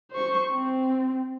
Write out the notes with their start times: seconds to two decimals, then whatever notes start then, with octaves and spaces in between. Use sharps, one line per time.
0.11 C5 C#6
0.52 C4